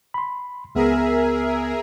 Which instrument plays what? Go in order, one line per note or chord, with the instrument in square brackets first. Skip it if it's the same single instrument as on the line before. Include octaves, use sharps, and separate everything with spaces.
[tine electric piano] B5 C6
[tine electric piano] C#2 B3 [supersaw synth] G#4 A#4 E5